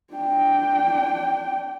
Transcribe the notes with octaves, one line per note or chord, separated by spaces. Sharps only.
D4 G5